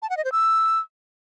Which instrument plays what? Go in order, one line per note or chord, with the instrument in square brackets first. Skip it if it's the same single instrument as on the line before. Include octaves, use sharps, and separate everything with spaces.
[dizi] A5
F#5
D#5
C5
E6